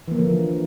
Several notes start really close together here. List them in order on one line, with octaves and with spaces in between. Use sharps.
E3 A#3 F3 D3